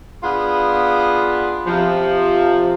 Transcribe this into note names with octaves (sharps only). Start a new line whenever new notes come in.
B3 D4 F4 G#4
C3 F3